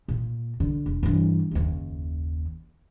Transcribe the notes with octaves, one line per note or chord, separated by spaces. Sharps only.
A#2
D3
E1
G2 E3
F#1 D#2